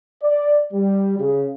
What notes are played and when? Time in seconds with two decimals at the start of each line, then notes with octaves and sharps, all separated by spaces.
0.22 D5
0.73 G3
1.19 C#3